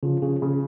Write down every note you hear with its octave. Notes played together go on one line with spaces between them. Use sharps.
C#3 F3
C#3
C#3